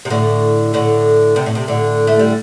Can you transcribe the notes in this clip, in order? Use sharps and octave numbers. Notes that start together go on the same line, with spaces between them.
C3
A2 D3
A2 D3
C3
A2
C3
A2 D3
A3
G3